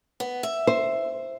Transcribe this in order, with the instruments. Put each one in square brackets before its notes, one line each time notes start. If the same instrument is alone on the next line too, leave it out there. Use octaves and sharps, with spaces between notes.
[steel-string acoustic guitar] B3
E5
[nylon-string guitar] C5